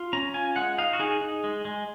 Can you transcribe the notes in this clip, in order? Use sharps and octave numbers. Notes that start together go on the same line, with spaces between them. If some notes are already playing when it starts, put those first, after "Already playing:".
Already playing: F4
C#4 A#5
F4 G#5
G#3 F#5
D#4 F5
F#4
D#4 G#4
D#4
G#3
G#3